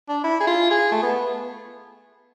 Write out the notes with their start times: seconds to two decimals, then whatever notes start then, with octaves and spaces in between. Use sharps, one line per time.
0.09 D4
0.24 E4
0.41 G#4
0.47 F4
0.71 G#4
0.92 A3
1.03 B3